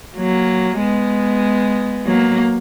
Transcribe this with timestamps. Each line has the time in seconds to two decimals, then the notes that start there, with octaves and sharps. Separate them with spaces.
0.17 F#3 A#3
0.79 G#3 B3
2.06 F#3 A#3